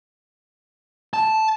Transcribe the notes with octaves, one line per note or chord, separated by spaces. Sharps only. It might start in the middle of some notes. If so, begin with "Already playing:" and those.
A5